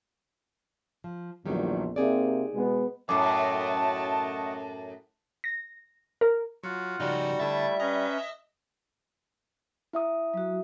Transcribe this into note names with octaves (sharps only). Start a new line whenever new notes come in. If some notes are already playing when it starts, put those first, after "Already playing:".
F3
A#1 E2 D#3 F#3 G3
C3 A#3 D#4 G#4 D5
B2 G#3 B3
F#2 A2 A3 D#5 F#5 A5 D6
A#6
A#4
F#3 F4 F#5
C#3 F3 G3 D#4 F#4
D3 A3 E4 E5 A6
C#4 B4 D#5 A#5
E4 E5 D#6
F#3 F#4